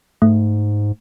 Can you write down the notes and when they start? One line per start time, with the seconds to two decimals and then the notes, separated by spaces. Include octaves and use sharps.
0.22 G#2 A3